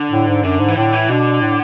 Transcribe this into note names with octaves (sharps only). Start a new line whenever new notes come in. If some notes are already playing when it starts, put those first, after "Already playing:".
Already playing: D3
A2
G#2
F#2 D3
G#2
E3
A2 D3
E3
B2 D3
A2